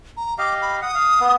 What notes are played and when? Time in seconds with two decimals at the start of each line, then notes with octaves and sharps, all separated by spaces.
0.17 A#5
0.38 G4 D#5 F5 D6
0.62 B5
0.81 F#5 D#6
0.95 F5
1.20 B3